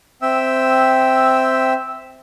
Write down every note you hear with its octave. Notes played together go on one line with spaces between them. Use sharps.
C4 E5 G5 E6